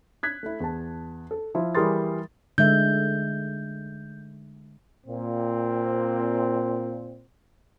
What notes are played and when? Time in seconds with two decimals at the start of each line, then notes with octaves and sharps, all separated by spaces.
0.23 F#6 G#6 B6
0.43 A3 E4
0.60 E2 A5
1.31 A4
1.55 F3 E4 F4
1.75 E3 G3 G#4 A#4 C6 A6
2.58 D3 G#3 E5 G6
5.06 A#2 C4